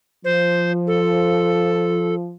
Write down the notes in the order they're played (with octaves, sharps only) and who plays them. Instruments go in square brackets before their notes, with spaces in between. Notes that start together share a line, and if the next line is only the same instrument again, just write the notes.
[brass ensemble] F3 [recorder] C5
[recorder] A4